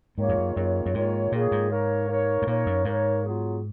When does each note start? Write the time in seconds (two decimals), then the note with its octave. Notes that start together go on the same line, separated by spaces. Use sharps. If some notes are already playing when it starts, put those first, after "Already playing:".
0.18 G#2 D#3 A#3 F4 G#4 C#5
0.29 F2
0.38 F#2
0.56 F#2 D#3 A#3 F4 G#4 C#5
0.86 F#2
0.94 G#2 D#3 A#3 F4 G#4 C#5
1.32 A#2 D#3 A#3 F4 G#4 C#5
1.51 G#2
1.70 A#3 D#4 A#4 C#5
2.08 A#3 D#4 A#4 C#5
2.42 G#2
2.47 A#2 A#3 D#4 A#4 C#5
2.66 F#2
2.85 G#2 A#3 D#4 A#4 C#5
3.23 F#3 B3 F4 G#4